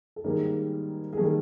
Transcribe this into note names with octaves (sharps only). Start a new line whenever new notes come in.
A4
G#2 D#3 G3 A#3 G#4 A#4
G#4
D#3 G3 A#3 A4